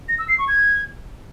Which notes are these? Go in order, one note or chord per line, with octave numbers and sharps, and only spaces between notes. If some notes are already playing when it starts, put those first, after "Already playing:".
A#6
E6
C7
C#6
G#6